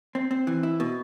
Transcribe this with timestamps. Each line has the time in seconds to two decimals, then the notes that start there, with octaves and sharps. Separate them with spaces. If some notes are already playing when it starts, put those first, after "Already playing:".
0.15 C4
0.31 C4
0.47 E3
0.63 E4
0.80 B2